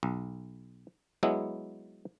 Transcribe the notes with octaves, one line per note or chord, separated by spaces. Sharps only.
B1
F#3 G#3 B3 E4